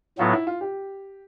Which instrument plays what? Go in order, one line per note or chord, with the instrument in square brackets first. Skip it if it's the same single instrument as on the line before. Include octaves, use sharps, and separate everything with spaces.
[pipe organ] A2 F#3 B3 [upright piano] F4
[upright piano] E4
F4
G4